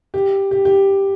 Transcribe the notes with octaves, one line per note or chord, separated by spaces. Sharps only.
G4
G4
G4